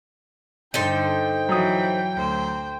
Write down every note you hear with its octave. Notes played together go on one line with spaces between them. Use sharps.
G2 D3 D#4 A4 C5 G5
E3 F#3 D#6
D2 C5